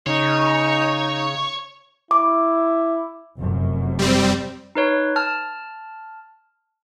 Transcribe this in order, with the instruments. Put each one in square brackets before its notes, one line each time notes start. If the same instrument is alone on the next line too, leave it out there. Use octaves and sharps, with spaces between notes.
[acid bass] C#3 [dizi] D#4 [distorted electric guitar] C#5
[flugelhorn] E4 [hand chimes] D6
[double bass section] F1 F#2
[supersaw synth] G3 C4
[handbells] D#4 B4 C#5
A5 F6